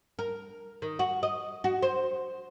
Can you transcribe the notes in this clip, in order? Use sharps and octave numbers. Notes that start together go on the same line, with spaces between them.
A#4
D#3
F#4
D#5
F#4
C5